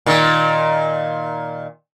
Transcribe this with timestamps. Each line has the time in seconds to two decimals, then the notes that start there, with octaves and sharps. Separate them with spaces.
0.06 A#2 D#3